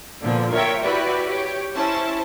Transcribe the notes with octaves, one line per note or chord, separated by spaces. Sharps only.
A#2 D3 F3 B3
F4 A#4 C#5 E5 G5
E4 F#4 G4 B4 D5
G4 C#5
C#4 E4 C5 A5